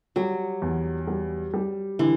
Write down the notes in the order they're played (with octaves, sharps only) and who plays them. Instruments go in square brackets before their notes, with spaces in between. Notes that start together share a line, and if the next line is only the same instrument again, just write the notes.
[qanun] F#3 [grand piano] G3
[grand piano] E2
G3
G3
[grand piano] D3 [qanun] E3